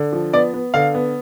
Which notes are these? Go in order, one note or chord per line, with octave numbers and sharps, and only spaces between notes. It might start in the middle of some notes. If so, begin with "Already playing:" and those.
Already playing: D3
F3
B3 D5
B3
D3 F5
B3